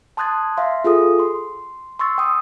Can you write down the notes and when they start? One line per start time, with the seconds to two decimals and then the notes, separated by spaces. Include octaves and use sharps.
0.17 A5 C6 D#6 F#6 G#6 A6
0.57 E5 F5 C6
0.84 F4 G#4 A4 D#6
1.19 C6
1.99 C6 C#6 E6 A6
2.18 G5 D#6